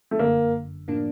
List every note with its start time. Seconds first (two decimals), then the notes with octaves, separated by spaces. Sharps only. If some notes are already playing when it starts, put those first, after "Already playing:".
0.11 A3
0.19 G1 F#2 D3 A#3
0.88 A2 F3 A#3 D4